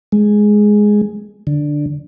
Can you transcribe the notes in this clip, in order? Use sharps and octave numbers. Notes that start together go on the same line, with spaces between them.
G#3
D3